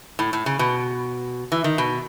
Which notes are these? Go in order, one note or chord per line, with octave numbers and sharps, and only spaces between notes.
A2
A2
C#3
B2
E3
D#3
B2